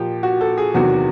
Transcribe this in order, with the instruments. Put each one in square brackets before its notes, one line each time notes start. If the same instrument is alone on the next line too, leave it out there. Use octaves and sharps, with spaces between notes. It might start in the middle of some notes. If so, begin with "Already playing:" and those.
Already playing: [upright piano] A#2 F3 G4
F#4
A4
G#4
E2 C3 D#3 F#3 F#4